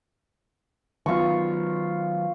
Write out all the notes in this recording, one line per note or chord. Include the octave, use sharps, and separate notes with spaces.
D#3 F#3 B3 F4 C#6